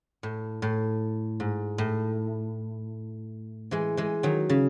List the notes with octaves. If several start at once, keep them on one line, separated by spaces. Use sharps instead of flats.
A2
A2
G#2
A2
E3 G#3
E3 G#3
D#3 F#3
C#3